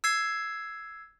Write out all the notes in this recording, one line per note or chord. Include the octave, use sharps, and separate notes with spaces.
E6 G#6 C7